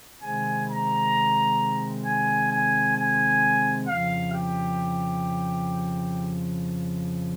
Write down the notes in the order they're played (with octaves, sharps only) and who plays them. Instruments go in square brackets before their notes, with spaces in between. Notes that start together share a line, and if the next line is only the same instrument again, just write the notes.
[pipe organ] C3 D#3 G#3 C4 [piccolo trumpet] G#5
[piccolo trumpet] A#5
G#5
G#5
G#5
[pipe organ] F2 C#3 F3 [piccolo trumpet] F5
[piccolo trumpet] G4